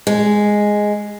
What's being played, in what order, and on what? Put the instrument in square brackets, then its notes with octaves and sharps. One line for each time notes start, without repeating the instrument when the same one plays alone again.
[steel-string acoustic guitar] G#3